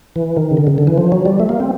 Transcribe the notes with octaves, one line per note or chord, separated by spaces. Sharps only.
E3
D#3
C#3
D3
C#3
D3
E3
F3
F#3
G3
A3
A#3
C4